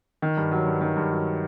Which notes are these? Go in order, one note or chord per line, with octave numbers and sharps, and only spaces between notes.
D#3
G2
F#3
G2
D#3
G2
F#3